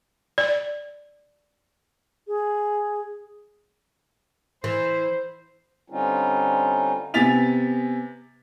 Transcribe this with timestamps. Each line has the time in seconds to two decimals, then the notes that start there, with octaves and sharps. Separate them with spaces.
0.38 D5
2.28 G#4
4.64 E3 C5
5.90 D3 G3 C4 C#4 D#4 F4
7.14 C3 B3 G#5 A6 B6 F7